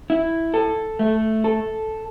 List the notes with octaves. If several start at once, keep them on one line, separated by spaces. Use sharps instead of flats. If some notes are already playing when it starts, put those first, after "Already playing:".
E4
A4
A3
A4